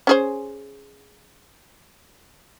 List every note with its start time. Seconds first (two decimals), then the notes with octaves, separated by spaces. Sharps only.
0.07 C#4 G#4 C5